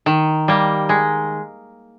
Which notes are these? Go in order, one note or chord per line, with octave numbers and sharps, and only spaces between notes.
D#3
G3 A#3
G#3